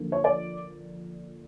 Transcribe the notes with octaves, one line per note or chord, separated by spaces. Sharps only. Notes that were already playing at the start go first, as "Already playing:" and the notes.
Already playing: D3 F3 A#3
C#5
D5